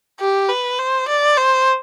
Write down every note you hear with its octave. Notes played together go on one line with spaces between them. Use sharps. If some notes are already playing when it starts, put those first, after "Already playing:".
G4
B4
C5
D5
C5